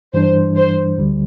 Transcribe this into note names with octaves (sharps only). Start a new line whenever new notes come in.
G2 E3 G3 D4 C5
C5
D2 D3 G3